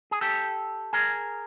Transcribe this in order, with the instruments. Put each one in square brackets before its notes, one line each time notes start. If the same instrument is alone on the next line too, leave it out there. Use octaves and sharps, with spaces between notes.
[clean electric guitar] G#4
G4 A4
G#4 A#4